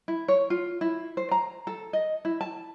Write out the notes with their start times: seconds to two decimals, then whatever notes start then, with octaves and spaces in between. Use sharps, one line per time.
0.08 E4
0.28 C#5
0.50 F4
0.81 E4
1.17 C5
1.31 A#5
1.67 A4
1.93 D#5
2.25 E4
2.41 A5